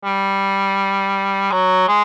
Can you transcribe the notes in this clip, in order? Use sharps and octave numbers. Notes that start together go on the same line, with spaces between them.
G3
F#3
G#3